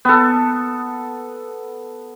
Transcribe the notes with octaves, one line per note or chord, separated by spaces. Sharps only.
B3 A4